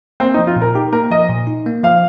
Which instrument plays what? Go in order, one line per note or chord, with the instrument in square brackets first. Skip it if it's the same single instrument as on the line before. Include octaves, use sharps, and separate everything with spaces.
[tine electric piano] A#3 [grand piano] C4
[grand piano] D#4
[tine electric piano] F3
[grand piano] F4
[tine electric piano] A#2
[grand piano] A#4
[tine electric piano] D#4 [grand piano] G4
[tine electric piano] A#3 [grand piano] A#4
[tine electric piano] F3 [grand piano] D#5
[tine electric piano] A#2
D#4
A#3
[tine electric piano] F3 [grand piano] F5